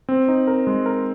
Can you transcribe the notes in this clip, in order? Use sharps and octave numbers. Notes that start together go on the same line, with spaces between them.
C4
D#4
A#4
G#3
A#4